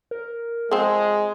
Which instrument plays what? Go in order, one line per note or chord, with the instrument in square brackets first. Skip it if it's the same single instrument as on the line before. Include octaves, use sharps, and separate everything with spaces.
[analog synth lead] A#4
[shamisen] F3 C4 [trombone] G#3 [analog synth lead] G#4